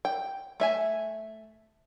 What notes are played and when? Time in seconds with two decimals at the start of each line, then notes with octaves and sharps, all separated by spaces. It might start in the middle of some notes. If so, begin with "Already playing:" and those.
0.05 G5
0.60 A3 E5 G#5